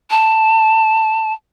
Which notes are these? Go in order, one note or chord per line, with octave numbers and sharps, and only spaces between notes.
A5